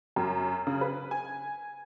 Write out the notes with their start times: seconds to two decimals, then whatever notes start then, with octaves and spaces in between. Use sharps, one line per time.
0.16 F#2
0.67 C#3
0.81 B4
1.11 G#5